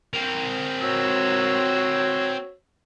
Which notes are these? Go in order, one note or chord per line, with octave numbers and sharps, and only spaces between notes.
C4 A#4
F#4 C#5 E6